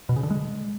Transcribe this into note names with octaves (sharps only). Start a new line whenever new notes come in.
B2
C#3
D3
G#3